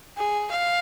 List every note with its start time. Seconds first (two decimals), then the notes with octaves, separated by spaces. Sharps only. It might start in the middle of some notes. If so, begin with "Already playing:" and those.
0.18 G#4
0.51 F5